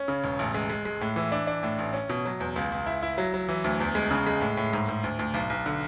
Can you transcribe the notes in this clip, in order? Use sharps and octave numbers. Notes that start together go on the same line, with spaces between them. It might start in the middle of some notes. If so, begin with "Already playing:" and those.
Already playing: C#4
C#3
E1
A1
G#3
G#3
G#3
A2
E3
D4
D4
A2
A1
C#4
B2
F#3
E2
C#2
C#2
E4
E4
F#3
F#3
E3
D2
E2
G#3
C#3
G#3
A2
A2
G#2
G#2
D2
D2
B1
B1
D3